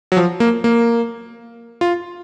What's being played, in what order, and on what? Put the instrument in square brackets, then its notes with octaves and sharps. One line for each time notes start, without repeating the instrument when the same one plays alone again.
[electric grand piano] F#3
F3
A#3
A#3
F4